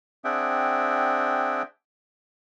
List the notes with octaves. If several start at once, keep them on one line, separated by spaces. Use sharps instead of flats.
C4 D4 G#4 E5 F#5 G5